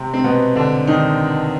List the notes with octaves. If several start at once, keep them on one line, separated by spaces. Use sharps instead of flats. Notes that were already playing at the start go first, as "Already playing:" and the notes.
Already playing: C3 C4
C4
B2 B3
D3 D4
D#3 D#4